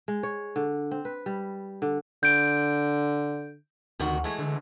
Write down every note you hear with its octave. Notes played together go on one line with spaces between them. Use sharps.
G#3
C#5
D3
C4
B4
G3
D3
D3 G6 D7
D2 C3 D#3 F#4
E3 G#3 A3
D3